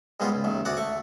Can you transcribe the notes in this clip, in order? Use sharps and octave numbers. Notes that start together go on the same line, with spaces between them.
G#2 G3 G#3 B3 F4
C#2
A1 D#2 D#3
D2 F#4 D5 F#5
A3 C#6